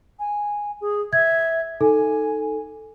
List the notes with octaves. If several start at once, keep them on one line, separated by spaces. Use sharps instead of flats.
G#5
G#4
E5 G#6
D#4 A4 G#5